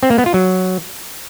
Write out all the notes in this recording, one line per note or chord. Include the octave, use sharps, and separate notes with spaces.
C4
A#3
B3
F4
F#3